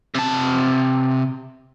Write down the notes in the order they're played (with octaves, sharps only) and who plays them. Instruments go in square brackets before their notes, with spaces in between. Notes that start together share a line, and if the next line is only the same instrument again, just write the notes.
[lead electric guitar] C3 A5